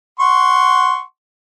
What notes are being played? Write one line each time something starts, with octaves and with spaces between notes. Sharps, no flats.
F#5 C6 C#6